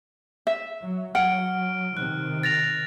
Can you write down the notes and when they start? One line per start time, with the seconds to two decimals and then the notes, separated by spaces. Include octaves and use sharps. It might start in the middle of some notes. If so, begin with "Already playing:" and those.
0.47 E5
0.83 F#3
1.15 F#3 F#5 F6 D7
1.97 C3 D#3 F#6
2.43 A6 A#6 F7